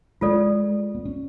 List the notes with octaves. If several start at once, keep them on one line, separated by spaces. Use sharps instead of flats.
G#3 F4 A4 D5
B3
C#4